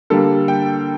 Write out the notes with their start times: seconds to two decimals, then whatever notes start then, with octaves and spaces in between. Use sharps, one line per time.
0.10 D3 G3 A#3 A4
0.48 G5